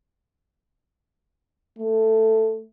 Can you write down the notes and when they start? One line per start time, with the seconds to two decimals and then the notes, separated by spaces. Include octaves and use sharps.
1.78 A3